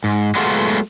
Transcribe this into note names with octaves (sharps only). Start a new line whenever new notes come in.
G#2
F#3 G#3 A3 B3 F4 F#4